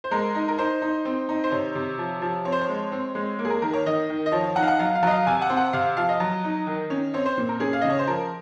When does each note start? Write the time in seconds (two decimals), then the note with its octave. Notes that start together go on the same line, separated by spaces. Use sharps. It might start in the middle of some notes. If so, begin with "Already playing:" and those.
0.04 C5
0.11 G#3 A#4
0.35 D#4
0.48 A#4
0.58 D#4 C5
0.82 D#4
1.05 C4
1.29 D#4
1.44 C5
1.51 C3 C#5
1.75 C3
1.98 F3
2.22 F3
2.45 C4 C#5
2.52 C5
2.61 C#5
2.69 G#3
2.92 C4
3.15 G#3
3.39 A#3
3.45 G#4
3.50 A#4
3.62 D#3 A#4
3.73 C#5
3.86 D#3 D#5
4.09 D#3
4.26 D#5
4.32 F3 C#5
4.44 C#5
4.56 D#4 F#5
4.62 F5
4.68 F#5
4.79 F#3 F5
4.95 F5
5.03 F#3 D#5
5.11 F5
5.26 C3 G#5
5.42 F#5
5.50 C4
5.57 F#5
5.73 C3 F5
5.97 F3 F5
6.09 D#5
6.20 F#3
6.44 D#4
6.67 D#3
6.90 C#4
7.14 C4 C#5
7.26 C5
7.37 A#2
7.49 A#4
7.60 C#4 G#4
7.73 F5
7.81 C#3 D#5
7.90 C#5
7.99 C5
8.07 F3 A#4